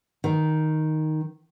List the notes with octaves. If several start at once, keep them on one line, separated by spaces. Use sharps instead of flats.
D#3